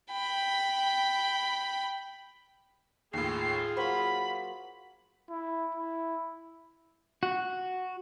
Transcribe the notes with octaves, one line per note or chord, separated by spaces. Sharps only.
G5 B5
D#2 A2 F4 G#4 C7
F#3 A#3 C5 B5
E4
E4
F#4